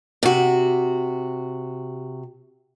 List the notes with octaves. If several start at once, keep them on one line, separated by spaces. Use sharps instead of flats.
C3 F#4